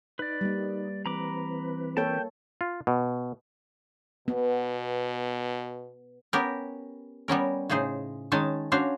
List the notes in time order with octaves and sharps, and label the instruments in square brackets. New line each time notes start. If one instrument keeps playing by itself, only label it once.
[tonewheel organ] D#4 [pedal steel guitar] B4 D5
[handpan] G3 A#3
[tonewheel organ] E3 C4 B4 [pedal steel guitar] A#5 B5 D6
[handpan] A#3 A4 C#5 [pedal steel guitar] G5 A5
[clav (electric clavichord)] F4
B2
[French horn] B2 [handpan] B3
[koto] B3 C#4 G4 A#4
G3 B3 C#4 A#4
A2 C#3 D#4 G#4 C5
D#3 G#3 C#4 D#4 G#5 A5
C#4 D4 F#4 C5 F5